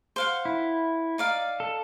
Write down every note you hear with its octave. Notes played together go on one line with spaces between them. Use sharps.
C5 F5 F#5
E4
D#4 D5 F5
A4